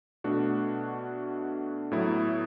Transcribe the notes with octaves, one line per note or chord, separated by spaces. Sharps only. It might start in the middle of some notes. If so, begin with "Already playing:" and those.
B2 A3 D4 F#4
A2 F#3 B3 E4